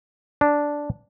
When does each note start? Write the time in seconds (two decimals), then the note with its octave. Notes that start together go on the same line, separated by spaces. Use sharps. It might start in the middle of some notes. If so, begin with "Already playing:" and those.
0.41 D4